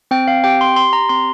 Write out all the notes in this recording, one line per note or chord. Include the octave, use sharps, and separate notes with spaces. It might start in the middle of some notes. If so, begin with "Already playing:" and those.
C4 G5
F5
G4 G5
C6
G4 C6
A#5
C4 C6